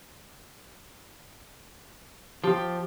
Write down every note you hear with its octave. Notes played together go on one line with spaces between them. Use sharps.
F3 G4 A5